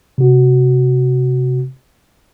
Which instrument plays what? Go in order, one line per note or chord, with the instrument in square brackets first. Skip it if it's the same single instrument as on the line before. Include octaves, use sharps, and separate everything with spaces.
[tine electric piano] C3 F#4